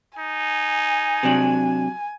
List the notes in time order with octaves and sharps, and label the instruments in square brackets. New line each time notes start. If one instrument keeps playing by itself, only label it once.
[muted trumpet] D#4 [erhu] G#5
[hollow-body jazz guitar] C3 F#3 D4